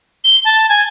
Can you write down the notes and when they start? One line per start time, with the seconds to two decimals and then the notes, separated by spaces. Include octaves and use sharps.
0.24 G7
0.45 A5
0.69 G#5